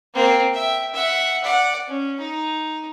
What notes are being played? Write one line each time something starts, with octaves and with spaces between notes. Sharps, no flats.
A#3 C4
E5 G5
E5 F#5
D5 F#5
C#4
D#4